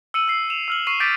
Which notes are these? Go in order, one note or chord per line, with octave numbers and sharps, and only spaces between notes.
E6 C#7 D#7 F#7
E6 C7
E7 F7
E6 F6 F#7
C#6 C7 D#7
D6 G6 A6 B6 D7